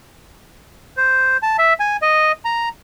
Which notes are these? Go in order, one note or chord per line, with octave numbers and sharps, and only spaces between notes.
C5
A5
E5
G#5
D#5
A#5